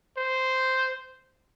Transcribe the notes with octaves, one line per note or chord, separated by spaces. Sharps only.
C5